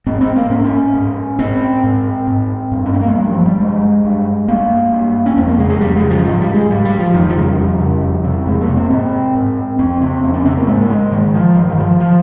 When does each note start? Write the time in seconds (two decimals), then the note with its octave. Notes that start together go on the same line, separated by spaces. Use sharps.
0.06 G#2 C4
0.21 C4
0.36 A#3
0.50 G#2 C#4
0.65 C#4
0.95 G#2
1.39 G#2 C4
1.84 G#2
2.27 G#2
2.72 G2
2.86 C#4
2.93 C4
3.01 A#3
3.08 G#3
3.15 G2 G3
3.30 F3
3.46 G3
3.60 G2 G#3
4.05 G2
4.48 G2 A#3
4.92 G2
5.26 C#4
5.37 F2 C4
5.48 A#3
5.59 C#3 G#3
5.70 G#3
5.81 F2 G3
5.96 G#3
6.03 C#3
6.10 F3
6.25 G#2 F3
6.40 G3
6.54 G#3
6.69 G#2 G3
6.85 G3
7.00 F3
7.14 F2 D#3
7.29 F3
7.36 C#3 G#3
7.43 G3
7.58 F2
7.80 C#3
8.02 F2
8.25 C3
8.46 F2 G#3
8.61 A#3
8.68 C3
8.77 C4
8.90 G#2 C4
9.35 G#2
9.79 F2 C4
10.01 C#3 C4
10.23 F2 C4
10.34 C#4
10.45 C#3 C4
10.57 A#3
10.67 G#2 G#3
10.81 A#3
10.90 G#3
11.12 G#2 D#3
11.34 F3
11.56 G2 D#3
11.69 D#3
11.78 F3
12.00 F3